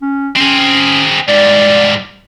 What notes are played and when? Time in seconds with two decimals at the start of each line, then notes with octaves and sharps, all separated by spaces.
0.02 C#4
0.36 C4 C#4 G#4
1.28 G#2 G3 D5